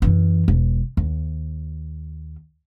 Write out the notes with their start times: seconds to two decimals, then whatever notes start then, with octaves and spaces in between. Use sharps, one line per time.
0.02 F#2 E3
0.48 E1
0.97 D#2